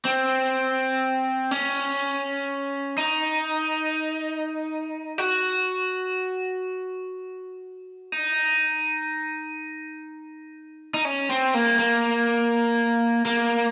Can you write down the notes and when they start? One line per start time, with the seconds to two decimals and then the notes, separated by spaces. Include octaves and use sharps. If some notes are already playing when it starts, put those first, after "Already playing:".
0.05 C4
1.51 C#4
2.98 D#4
5.18 F#4
8.12 D#4
10.94 D#4
11.05 C#4
11.29 C4
11.54 A#3
11.79 A#3
13.25 A#3